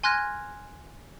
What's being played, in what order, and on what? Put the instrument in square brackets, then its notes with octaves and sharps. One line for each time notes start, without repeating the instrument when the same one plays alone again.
[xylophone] G#5 C6 F6 F#6 G#6 A#6